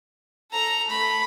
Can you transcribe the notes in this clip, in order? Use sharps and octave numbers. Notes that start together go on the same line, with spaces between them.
A4 A#5
A3 B5